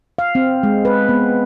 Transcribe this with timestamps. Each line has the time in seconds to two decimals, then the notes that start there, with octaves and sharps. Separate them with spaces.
0.18 F5
0.35 C4
0.63 G#3
0.85 B4
1.09 B3